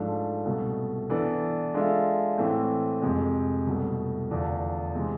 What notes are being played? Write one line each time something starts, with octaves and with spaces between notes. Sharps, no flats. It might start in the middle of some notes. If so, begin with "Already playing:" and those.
Already playing: G#2 F3 A3 D4
C2 B2 A3
E3 B3 D4 A4 D5
G#3 D4 F4 A4 E5
A2 E3 A3 C4
F2 C3 G#3
C2 B2 A3
E2 D3 F3 A3 D4
C3 E3 G#3 C4